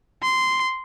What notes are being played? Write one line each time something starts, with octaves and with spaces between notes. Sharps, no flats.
C6